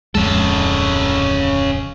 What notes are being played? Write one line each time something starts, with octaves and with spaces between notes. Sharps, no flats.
D1 F2 C#3 G#3 A4